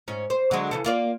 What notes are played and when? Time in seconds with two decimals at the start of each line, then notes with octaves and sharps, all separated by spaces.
0.08 G#2 C#4
0.30 C5
0.51 D3 F#3 G#3
0.71 C#3 E3 A4
0.84 A#3 F4 D5